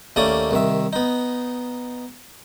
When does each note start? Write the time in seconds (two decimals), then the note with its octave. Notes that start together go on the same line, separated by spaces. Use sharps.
0.16 D#2 A3 A#3 C#4 D5 D#6
0.51 C2 D#3 E5
0.93 B3 D#4